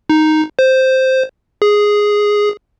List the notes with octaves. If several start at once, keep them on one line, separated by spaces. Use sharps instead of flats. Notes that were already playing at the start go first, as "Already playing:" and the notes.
D#4
C5
G#4